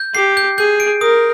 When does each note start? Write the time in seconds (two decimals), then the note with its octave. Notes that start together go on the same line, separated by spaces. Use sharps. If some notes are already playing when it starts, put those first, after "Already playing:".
Already playing: G6
0.15 G4 C7
0.37 G6
0.58 G#4 G6
0.80 D7
1.01 A#4 D#6